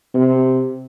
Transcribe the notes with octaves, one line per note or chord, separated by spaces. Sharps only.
C3